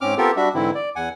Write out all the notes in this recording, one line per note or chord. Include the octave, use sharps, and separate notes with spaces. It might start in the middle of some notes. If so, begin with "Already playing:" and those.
G#2 C4 C#4 D6 F6
B3 C4 F4 G4 A4 A#4
G3 D4 F#4 E5
G#2 D3 E3 C4 E4
D5
E2 F#5 G#5